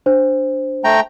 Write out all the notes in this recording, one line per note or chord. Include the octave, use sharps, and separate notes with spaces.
D4 C5
A3 G5 A#5